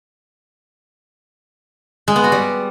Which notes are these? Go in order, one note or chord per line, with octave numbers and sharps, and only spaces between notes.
G#3
B3
F#4
G3